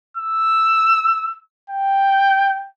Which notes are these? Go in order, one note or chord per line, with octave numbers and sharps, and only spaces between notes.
E6
G5